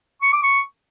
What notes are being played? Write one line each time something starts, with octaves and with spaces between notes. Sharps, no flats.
C#6
D6
C#6